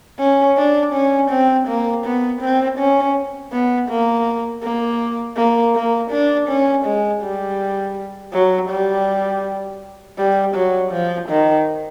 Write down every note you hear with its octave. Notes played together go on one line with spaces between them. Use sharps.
C#4
D4
C#4
C4
A#3
B3
C4
C#4
B3
A#3
A#3
A#3
A#3
D4
C#4
G#3
G3
F#3
G3
G3
F#3
F3
D#3